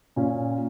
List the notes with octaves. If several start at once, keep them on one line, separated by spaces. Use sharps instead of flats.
A#2 C#4